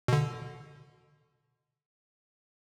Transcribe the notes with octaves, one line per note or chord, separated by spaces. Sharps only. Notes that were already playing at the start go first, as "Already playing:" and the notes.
B2 D3